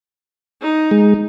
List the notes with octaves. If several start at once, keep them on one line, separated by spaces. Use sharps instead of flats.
D#4
G#3